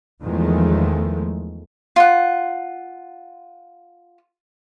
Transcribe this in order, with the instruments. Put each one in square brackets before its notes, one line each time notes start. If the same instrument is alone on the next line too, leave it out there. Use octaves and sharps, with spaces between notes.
[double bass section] E2 D#3 F3 G#3 A3
[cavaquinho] F4 F#5